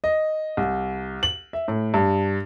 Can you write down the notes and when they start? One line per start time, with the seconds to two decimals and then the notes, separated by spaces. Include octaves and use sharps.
0.04 D#5
0.57 C2
1.23 F#7
1.53 E5
1.68 A2
1.94 G2